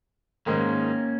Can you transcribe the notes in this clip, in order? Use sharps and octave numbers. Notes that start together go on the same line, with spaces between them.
G#2 D#3 G#3 A#3 C#4